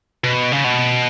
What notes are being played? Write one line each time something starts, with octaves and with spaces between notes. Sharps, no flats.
B2
C#3
B2